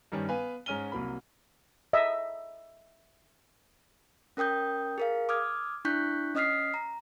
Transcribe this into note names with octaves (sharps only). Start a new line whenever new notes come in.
G2 D#3 G3 C#4
B3 B4 F5 G#5
G#2 G#3 C#4 F6 D#7 G7
C2 F#3 A#3 B5
D#5 E5
C#4 A#4 G5 D#6 G6
G#4 A#4 F5
D6 D#6 F6 G#6
D4 E4 C#6 F#6 G6 B6
C#4 D#5 D#6 F6 B6 C7
A#5